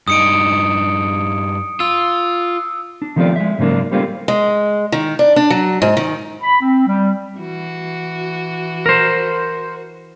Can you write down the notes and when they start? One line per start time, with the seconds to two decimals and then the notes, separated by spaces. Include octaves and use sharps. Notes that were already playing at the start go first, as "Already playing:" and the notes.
0.08 G2 D#4 D#6 C#7 D7
1.80 F4 E6
3.02 D4
3.16 D#3 F3 A3 C4 F4 D5
3.36 G#3 E5
3.59 G#2 C#3 F#3 A#3 D4
3.92 G3 A3 A#3 C4 C#4 F4
4.28 G#3
4.92 D#3
5.19 D4
5.36 D4
5.50 F#3
5.82 G#2
5.97 D#3
6.42 B5
6.61 C4
6.87 G3
7.38 E3 F#4
8.86 A#4 C5